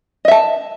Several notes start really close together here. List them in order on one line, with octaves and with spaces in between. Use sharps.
D#5 E5 A5